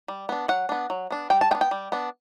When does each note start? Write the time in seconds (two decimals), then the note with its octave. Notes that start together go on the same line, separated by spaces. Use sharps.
0.08 G3
0.29 B3 D4
0.48 F#3 F#5
0.69 B3 D4
0.90 F#3
1.11 B3 D4
1.30 G3 G5
1.41 A5
1.51 B3 G5
1.55 D4
1.61 G5
1.71 G3
1.92 B3 D4